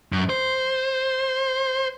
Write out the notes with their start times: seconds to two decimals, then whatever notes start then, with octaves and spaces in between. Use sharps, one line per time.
0.12 F#2
0.29 C5